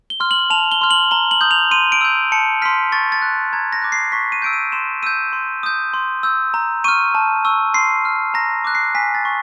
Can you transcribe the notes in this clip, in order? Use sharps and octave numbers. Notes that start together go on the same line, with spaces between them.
G7
C6 F6
F#7
A5 F7
G7
C6 F6
F#7
A#5 G7
F#7
D#6 G6
F7
C6 D#7
D7
E6 G6
A5 C#7
C6 F6 B6
C#6 A6
A6
F#6
A#5 G#6
A#6
D6 F#6
C7
C#6 B6
D#7
E6 G6 D7
D#7
C6 E7
E6 G6 D#7
C6
D#6 G6
C6
E6 G6
A#5
C#6 F6 D#7
A5
C#6 E6
C6 C7
F6
A#5 A#6
D6 F#6
C7
G#5 B6
A6
C#6